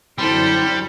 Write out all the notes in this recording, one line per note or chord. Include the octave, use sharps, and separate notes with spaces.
F#2 D3 F#3 G3 C4 E4 A4 C5